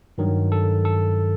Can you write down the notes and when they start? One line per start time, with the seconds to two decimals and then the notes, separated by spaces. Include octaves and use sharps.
0.18 G2 D#3 F#3
0.52 A4
0.85 A4